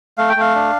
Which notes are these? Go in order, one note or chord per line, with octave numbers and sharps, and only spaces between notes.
A3 F5
G5
A3 F5
D4